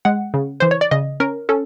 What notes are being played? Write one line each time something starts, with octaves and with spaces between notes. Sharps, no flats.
G#3 F#5
C#3
E3 C5
C#5
D5
C#3 D#5
C#4 A#4
C#4 A4